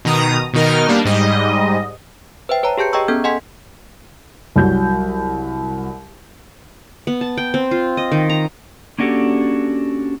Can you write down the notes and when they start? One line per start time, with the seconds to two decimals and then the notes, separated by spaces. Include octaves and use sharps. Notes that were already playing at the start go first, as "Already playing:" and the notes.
0.05 B2 D#3 A#5 D#6
0.54 B2 D#3 D#4 A#4 F6
0.88 G3 A#3 D4
1.05 G#2 G3 D#5
2.49 B4 C5 E5 G5
2.63 B4 C#5 A5 A#5
2.77 G4 G#4 A5 G6 C#7
2.93 G#4 D#5 G5 A#5 C#6 E6
3.08 B3 C#4 A4 G6 G#6
3.24 D#5 F#5 G#5 C6 G#6 B6
4.56 C2 F#3 G6
7.07 B3
7.21 A5
7.37 G5
7.54 C4
7.71 F4
7.97 D#5
8.12 D#3
8.29 A#5
8.98 A#3 C#4 D4 F#4 G4 A4